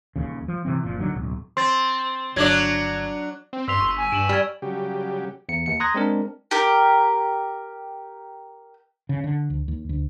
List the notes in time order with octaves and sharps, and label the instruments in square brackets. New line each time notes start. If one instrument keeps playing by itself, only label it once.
[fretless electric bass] D#1 D#2 C#3
F3
C3 E3 C4
F#1 A#2 F3
A#1 D3 D#3 F#3
D1 B1
[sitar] C4 [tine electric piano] C6 A6
[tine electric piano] G1 G#6 [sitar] F#3 D4 D5
[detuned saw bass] C4
[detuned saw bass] G2 [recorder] C6 [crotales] E6 B6 F7
[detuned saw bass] G1 [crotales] C#6
[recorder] G#5
[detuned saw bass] G2 [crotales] D7 E7 F#7
[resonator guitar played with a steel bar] G3 [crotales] F6 G#6
[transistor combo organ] C#3 F#3 G3 G4
[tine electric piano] E2 C#7
D#2 C#7
A#5 C6 D#6 F#6 G#6 A#6
G#3 C4 D4 A#4
[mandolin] G4 A#4
[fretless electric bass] C#3
D3
D2
D#2
D2